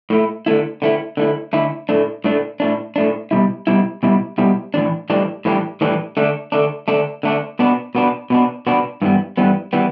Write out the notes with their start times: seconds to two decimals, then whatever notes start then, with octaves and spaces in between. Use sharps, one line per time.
0.10 A2 A3 E4
0.46 D3 A3 E4
0.82 D3 A3 E4
1.17 D3 A3 E4
1.53 D3 A3 E4
1.89 A2 A3 D4
2.24 A2 A3 D4
2.60 A2 A3 D4
2.96 A2 A3 D4
3.31 B2 G3 E4
3.67 B2 G3 E4
4.03 B2 G3 E4
4.38 B2 G3 E4
4.74 A2 E3 G3 D4
5.10 A2 E3 G3 D4
5.45 A2 E3 G3 D4
5.81 A2 E3 G3 D4
6.17 D3 A3 D4
6.52 D3 A3 D4
6.88 D3 A3 D4
7.23 D3 A3 D4
7.59 B2 B3 D4
7.95 B2 B3 D4
8.30 B2 B3 D4
8.67 B2 B3 D4
9.02 G2 E3 G3 B3
9.37 G2 E3 G3 B3
9.73 E3 G3 B3